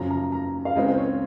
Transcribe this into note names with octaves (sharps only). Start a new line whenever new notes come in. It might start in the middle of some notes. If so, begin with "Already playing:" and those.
Already playing: F#2 C#3 F3 A#5
A#5
A#5
F5
C#2 C#3 G#3 C4 D#5
C5
C#5